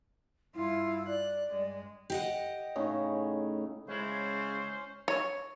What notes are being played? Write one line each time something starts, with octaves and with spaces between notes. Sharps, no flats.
G2 E4 F4
D5 F#6
G2 G#3
G4 D#5 F#5
A2 C#3 D#4
C#3 G#3 C#4 E4 C5
C#5